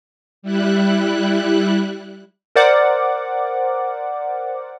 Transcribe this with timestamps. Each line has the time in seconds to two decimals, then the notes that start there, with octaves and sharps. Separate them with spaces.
0.42 G3 E4 F#6
2.56 A#4 C5 D5 F#5 D6